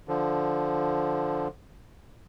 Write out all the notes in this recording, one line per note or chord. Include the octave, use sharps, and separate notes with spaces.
D3 F3